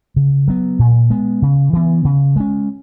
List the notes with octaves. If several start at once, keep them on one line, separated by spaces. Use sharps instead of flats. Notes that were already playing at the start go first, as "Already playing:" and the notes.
C#3
F#3 B3
A#2
G#3 B3
C#3
E3 B3
C#3
G#3 C#4